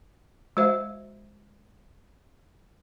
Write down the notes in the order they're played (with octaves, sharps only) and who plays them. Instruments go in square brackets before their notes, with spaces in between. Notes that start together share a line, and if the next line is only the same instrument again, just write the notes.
[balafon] G#3 F#4 C5 E5 F5